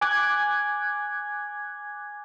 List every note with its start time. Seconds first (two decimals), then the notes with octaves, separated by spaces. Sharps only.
0.01 G#5 D6 F#6 G#6